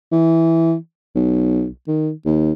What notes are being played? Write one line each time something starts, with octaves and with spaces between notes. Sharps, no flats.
E3
B1
D#3
D#2